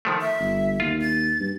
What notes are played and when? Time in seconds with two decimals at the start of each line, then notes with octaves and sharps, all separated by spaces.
0.05 D#3 F3 A3
0.21 E5
0.40 G1
0.80 D#2 F4
1.01 A6
1.40 G2